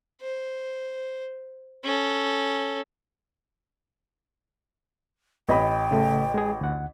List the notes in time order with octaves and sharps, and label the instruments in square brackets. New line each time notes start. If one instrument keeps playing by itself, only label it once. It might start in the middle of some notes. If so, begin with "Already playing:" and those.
[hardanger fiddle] C5
C#4 A4
[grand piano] A1 D#5 B5 [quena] G5
[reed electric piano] C#3 A3
G#3 G#4
D2 F#5